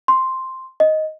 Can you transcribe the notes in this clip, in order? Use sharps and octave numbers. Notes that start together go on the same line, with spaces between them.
C6
D#5